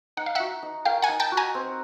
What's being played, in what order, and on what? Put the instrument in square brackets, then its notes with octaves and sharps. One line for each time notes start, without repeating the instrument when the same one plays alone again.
[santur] D#4 [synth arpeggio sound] F#5
[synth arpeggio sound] F5
[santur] F#4 [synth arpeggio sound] E5 F#5
[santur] D#4
[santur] A#4 [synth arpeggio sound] F5 G5
[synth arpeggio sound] F#5 G#5
[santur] D#4
[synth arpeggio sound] G5 A5
[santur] F#4
[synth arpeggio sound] G#5 A#5
[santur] C4